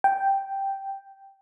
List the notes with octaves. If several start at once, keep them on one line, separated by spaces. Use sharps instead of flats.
G5